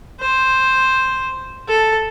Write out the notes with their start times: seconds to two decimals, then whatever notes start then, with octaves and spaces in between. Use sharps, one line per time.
0.20 C5
1.68 A4